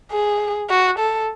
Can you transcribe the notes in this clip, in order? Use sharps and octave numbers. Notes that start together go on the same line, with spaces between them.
G#4
F#4
A4